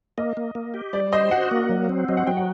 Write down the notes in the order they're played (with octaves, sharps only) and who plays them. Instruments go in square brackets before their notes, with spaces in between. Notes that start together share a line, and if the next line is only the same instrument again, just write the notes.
[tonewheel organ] A#3 [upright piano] D#5
[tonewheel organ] A#3
A#3
G4
[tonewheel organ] G3 [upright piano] D5
[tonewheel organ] C5 [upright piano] D#5
[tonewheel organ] F#4 [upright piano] F#5
[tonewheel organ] A#3
F#3
C4
[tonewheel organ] F#3 [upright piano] D#5
[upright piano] F#5
[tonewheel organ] F#3 [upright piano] G5
[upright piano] F#5